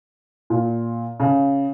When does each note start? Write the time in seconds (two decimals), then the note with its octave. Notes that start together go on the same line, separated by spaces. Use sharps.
0.50 A#2
1.20 C#3